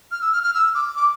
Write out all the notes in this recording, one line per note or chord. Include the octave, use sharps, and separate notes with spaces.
F6
E6
F6
F6
E6
D6
D6